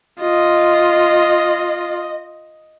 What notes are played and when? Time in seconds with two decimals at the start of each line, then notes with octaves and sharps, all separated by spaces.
0.21 F4 D#5